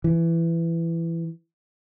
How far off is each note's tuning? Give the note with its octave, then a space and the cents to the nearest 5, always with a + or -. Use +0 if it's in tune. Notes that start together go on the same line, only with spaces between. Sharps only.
E3 +15